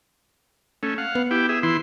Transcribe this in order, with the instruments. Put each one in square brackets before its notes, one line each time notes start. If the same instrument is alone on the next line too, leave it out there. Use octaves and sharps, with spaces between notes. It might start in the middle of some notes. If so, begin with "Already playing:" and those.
[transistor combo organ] A3 C#4
F5 F#5
[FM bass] B3
[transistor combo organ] E4 G4 G5
G#4 E5
E3 E4 C6